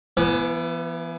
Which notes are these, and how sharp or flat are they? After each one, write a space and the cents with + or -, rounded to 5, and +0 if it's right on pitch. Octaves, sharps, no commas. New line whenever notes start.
E3 +30 B3 -15